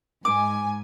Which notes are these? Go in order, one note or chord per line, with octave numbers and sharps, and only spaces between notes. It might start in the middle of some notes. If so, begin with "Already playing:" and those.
G#2 G#5 D6